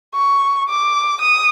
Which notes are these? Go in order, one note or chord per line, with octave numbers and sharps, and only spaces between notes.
C#6
D6
D#6